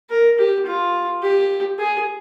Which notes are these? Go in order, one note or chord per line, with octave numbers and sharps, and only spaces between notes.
A#4
G4
F4
G4
G#4